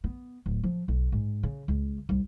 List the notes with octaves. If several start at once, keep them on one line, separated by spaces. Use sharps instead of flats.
B3
D1
F3
B1
G#2
C#3
C#2
C2